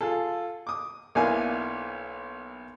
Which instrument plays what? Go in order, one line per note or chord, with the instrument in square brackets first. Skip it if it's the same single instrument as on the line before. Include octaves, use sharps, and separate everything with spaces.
[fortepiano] F4 G#4 A4
D6 D#6
B1 A#3 D4 E4 F5 G#5